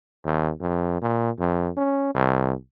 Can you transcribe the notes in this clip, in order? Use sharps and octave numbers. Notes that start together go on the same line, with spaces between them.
D#2
F2
A#2
F2
C#4
C2